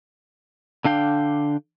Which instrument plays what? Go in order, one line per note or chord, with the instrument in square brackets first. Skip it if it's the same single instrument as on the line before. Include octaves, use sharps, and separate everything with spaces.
[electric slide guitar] D3 D4 F5 G5